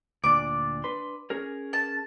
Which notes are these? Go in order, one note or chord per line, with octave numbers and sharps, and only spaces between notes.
D2 A#2 D4 D6
D4 B4 C6
C#4 G#4 A#4
A5